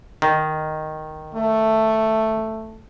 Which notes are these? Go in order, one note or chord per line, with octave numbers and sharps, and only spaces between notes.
D#3
A3